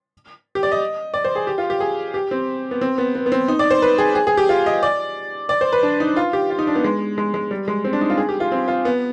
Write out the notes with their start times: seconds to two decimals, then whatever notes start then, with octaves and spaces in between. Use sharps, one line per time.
0.55 G4
0.63 D5
0.72 D#5
1.14 D5
1.24 C5
1.35 G#4
1.47 G4
1.58 F4
1.70 G4
1.80 G#4
2.14 G4
2.31 C4
2.71 B3
2.81 C4
2.98 B3
3.15 B3
3.26 B3
3.32 C4
3.48 D#4
3.59 D5
3.71 C5
3.82 B4
3.98 G#4
4.15 G#4
4.27 G#4
4.37 G4
4.49 F4
4.66 D#5
4.83 D5
5.49 D5
5.61 C5
5.73 B4
5.83 D4
6.00 D#4
6.16 F4
6.33 G4
6.50 F4
6.59 D#4
6.67 D4
6.75 B3
6.84 G#3
7.18 G#3
7.34 G#3
7.51 G3
7.68 G#3
7.84 C4
7.93 D4
8.01 D#4
8.10 F4
8.18 G#4
8.29 G4
8.40 F4
8.52 C4
8.68 F4
8.85 B3